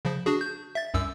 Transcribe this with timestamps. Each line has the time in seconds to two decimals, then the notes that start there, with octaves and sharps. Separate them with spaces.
0.05 C#3 F3
0.26 D4 F#4 G#4
0.41 G6
0.75 E5 A6
0.94 C2 F#2 E6